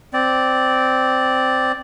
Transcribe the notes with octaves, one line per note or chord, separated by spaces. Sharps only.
C4 D5